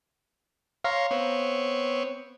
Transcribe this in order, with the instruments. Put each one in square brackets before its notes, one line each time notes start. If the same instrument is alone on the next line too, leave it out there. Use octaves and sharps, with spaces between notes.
[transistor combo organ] C#5 A#5 C6 [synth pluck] F5
[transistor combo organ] B3 C4 C#5